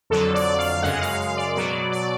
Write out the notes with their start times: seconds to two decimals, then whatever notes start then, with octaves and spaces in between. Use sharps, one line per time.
0.10 F2 D3 F#3 A4
0.34 D5
0.59 F5
0.83 F#2 C#3 G#3 F#5
1.01 F5
1.19 F5
1.37 D5
1.55 B2 F#3 D5
1.92 D5